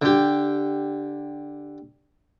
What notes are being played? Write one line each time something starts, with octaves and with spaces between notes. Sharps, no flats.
D3 G4